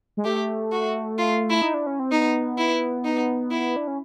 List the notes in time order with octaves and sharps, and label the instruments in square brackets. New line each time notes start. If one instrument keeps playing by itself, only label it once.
[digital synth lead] G#3
[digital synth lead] A3 [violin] G4
[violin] F#4
F4
E4
[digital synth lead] D#4
D4
C#4
C4
[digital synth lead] B3 [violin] D#4
[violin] E4
D#4
E4
[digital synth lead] D4
C#4